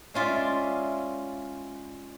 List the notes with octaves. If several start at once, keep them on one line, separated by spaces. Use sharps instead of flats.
G#3 C#4 F4 D5 E5